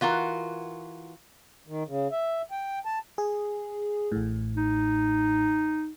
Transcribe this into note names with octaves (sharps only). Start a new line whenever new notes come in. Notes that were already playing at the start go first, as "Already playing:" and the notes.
E3 F4 F#4 A#4
D#3
C#3
E5
G5
A5
G#4
A1 A2
D#4